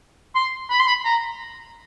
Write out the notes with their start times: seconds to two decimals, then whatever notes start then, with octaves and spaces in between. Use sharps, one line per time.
0.35 C6
0.70 B5
0.79 C6
0.87 B5
1.05 A#5